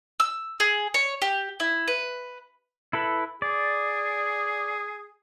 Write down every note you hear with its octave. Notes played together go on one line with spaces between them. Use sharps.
E6
G#4
C#5
G4
E4
B4
E4 A4 B4
G#4 D5